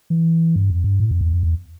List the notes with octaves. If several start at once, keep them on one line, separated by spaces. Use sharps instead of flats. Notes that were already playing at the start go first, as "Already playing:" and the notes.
E3
G2
F2
G2
A2
F2
E2
F2
E2